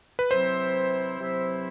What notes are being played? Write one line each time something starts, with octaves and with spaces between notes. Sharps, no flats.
B4
C3 F#3 C4 E4 C5
C3 F#3 C4 E4